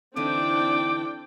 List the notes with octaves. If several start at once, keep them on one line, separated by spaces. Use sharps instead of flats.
D3 E3 C4 D4 D#4 G5 D6